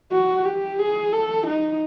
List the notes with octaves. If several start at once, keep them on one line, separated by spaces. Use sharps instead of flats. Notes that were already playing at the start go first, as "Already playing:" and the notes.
F#4
G4
G#4
A4
D#4